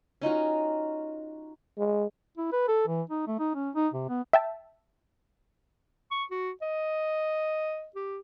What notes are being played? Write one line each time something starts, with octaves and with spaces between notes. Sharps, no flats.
C#4 D#4 F4 F#4
G#3
E4
B4
A4
E3
D#4
A3
D#4
C#4
D#4
C3
B3
E5 G5 A5
C#6
F#4
D#5
G4